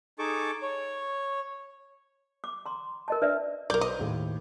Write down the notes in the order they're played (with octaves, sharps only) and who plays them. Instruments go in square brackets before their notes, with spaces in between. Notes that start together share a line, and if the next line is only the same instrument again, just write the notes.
[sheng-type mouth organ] D#4 G#4 A4 A5 C#6 D6
C#5
[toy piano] D6
A#5 C6
A#4 D#5 A5
D4 B4 D5 E5
[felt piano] B1 G6 [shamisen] A#4 D5
[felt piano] B4 C5 D6 [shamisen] D#5
[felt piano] D#2 A2